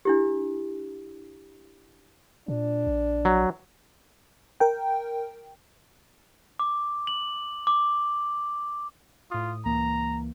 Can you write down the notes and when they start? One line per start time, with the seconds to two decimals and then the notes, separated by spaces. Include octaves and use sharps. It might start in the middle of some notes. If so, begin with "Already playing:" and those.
0.05 D4 E4 G4
2.48 A#2 D4
2.87 A#1
3.25 F#3
4.60 A#4 G5
6.59 D6
7.07 F#7
7.67 D6
9.31 A2 F4 D#6
9.65 C#2 E3 A#3 A#5